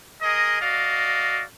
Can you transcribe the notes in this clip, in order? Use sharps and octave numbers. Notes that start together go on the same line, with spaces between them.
G#4 A#4 D#5
F#4 D5 D#5 F5